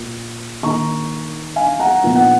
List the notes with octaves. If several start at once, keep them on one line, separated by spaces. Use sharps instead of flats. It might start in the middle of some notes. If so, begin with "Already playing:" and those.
Already playing: A#2
D#3 A#3 D#4 A#5 C#6
F5 G#5
F#5 A#5
A#2 F3 B3 D#4
F#5